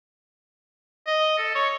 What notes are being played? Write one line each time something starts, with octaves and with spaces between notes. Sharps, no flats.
D#5
A4
C#5